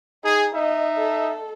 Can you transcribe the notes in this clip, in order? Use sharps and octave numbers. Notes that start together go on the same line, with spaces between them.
D#4 G#4
D#4 D#5 E5
A4